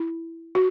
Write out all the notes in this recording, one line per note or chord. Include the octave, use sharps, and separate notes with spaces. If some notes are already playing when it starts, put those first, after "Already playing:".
Already playing: E4
F#4